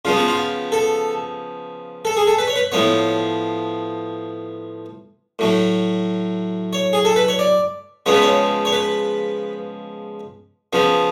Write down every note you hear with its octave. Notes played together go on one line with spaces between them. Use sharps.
C#3 F3 B3 F4
F#4
F4
A4
A4
G#4
A4
B4
C#5
B4
A2 F3 B3 C#5
A2 F#3 A3
C#5
G#4
A4
B4
C#5
D5
C#3 F3 G#3 B3 C#5
B4
C#5
C#5
B4
C#3 F3 B3